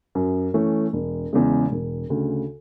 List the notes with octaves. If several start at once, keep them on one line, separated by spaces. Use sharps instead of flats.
F#2
E3 A3 C#4
E1
E2 C#3 G#3
E1
D2 C#3